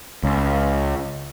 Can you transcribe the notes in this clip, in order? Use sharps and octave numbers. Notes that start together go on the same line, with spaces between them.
C#2